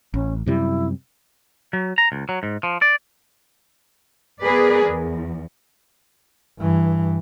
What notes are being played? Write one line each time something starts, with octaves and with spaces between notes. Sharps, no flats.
A1 C#4
F#2 C3 G3 E4
F#3
A#5
C#2
F#3
G#2
F3
D5
B3 G#4 A#4 B4 D5
E2
G2 E3